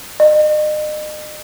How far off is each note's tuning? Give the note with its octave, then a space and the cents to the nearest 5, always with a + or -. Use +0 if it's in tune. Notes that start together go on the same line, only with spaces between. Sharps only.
D#5 -40